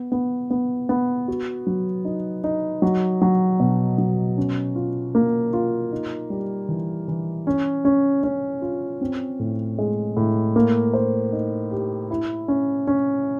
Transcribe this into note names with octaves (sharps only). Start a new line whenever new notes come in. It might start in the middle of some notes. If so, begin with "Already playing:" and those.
Already playing: B3
B3
B3
B3
F#4
F#3
D#4
D#4
F#3
F#3
B2
F#3
C#4
F4
A#3
F4
D#4
G3
E3
E3
C#4
C#4
C#4
F4
C4
A2
G#3
A2
A#3
C5
D#4
G4
E4
C#4
C#4